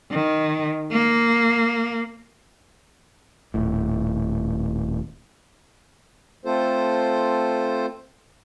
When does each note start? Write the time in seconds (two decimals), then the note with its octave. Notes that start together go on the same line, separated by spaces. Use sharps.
0.11 D#3
0.92 A#3
3.54 D#1 A2
6.44 A3 C4 F4 A4 C5